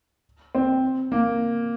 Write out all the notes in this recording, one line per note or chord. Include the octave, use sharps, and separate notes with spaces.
C4
A#3